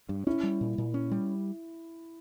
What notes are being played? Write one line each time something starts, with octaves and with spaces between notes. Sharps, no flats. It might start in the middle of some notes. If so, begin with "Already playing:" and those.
G2
C#4 E4
G3
A#2
A#2
C#4
G3